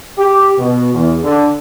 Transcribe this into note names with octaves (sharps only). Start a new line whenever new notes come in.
G4
B2
E2
D3